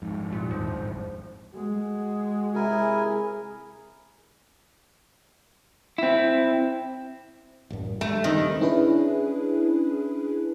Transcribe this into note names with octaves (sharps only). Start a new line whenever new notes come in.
F2 G#2
G2 A#2
D#2 F3
A1
G#3 F#4
C3 E4 G#4 A#4 G#5
C4 E4
A1 F#2
G2 G#3 A3
D#1 D#3 G3 C4
C#4 D4 E4 G#4 B4